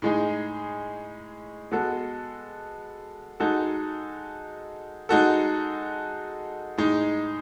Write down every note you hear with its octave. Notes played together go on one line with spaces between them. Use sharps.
A2 G#3 D#4 G#4
G#3 B3 F#4 A4
G#3 D#4 F#4 A4
G#3 D#4 F#4 A4
A2 G#3 D#4